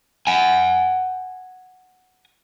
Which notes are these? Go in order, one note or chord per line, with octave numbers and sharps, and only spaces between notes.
F#5 G#5